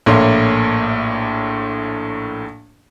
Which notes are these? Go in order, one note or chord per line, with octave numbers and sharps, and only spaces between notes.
A#1 A2 A#3 C#5 C6